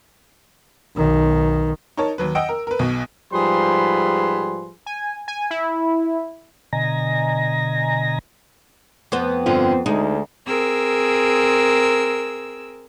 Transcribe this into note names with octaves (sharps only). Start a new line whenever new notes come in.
B1 D#3
D#4 A#4 C#5 A5
D#2 F#3 B4
D#5 F#5 G5 E6 D7
A#4
A#4 B4
B1 B2
G#2 F3 G3 G#4 B4 C6
G#5
G#5
E4
B2 D3 D#5 G#5 A#5 A#6
F2 B3 C5
G2 D3 C4 F4
D2 G#3 D#4
C4 G#4 A#4 E6